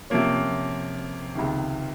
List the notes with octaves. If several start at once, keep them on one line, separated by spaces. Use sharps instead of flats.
C3 F3 A#3 C#4
C#2 C3 D#3